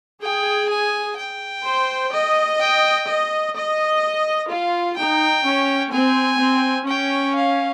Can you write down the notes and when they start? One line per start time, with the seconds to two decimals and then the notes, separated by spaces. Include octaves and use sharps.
0.22 G#4 G5
0.69 G#5
1.17 G5
1.64 C5
2.12 D#5
2.60 G5
3.07 D#5
3.55 D#5
4.49 F4 F5
4.97 D#4 G5
5.45 C#4
5.92 C4 G#5
6.40 C4
6.87 C#4 G5
7.35 F5